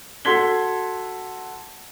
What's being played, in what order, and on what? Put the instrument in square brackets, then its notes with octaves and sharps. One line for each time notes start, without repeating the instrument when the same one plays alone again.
[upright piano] F#4 A4 C6 G#6 B6 G7